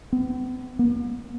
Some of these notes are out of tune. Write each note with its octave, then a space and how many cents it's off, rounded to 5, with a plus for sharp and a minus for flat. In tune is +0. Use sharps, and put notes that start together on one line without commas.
B3 +40
B3 -45